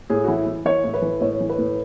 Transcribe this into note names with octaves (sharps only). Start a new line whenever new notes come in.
A2 G#4
F#4
E3 E4
E3
E3 C#5
A2
B4
E3
A2 C#5
E3
B4
A2